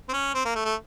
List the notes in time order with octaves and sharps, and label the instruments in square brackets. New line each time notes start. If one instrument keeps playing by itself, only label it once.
[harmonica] C4
C#4
C4
A#3
A3
A3